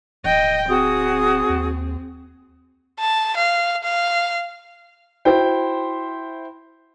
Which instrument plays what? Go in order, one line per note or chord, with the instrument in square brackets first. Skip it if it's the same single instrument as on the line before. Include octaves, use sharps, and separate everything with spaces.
[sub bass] D1 [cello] D#5 G5
[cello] C4 [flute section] F#4 G#4 D#6
[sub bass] D#2
[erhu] A5
F5
F5
[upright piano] E4 F#4 C5 G5